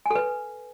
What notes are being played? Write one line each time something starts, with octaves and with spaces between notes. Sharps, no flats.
A4 B4 G#5